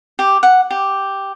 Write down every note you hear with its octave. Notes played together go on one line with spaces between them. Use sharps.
G4
F#5
G4